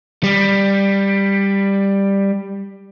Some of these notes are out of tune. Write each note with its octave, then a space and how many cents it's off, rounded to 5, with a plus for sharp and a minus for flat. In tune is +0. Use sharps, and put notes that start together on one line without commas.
G3 +10